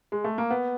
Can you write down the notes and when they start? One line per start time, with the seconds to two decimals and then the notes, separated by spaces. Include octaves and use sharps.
0.12 G#3
0.24 A3
0.38 A#3
0.50 B3